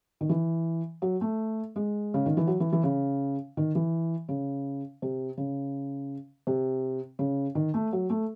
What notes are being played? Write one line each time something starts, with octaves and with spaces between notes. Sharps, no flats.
D#3
E3
F#3
A3
G#3
C#3
D#3
E3
F#3
E3
E3
C#3
D#3
E3
C#3
C3
C#3
C3
C#3
D#3
A3
F#3
A3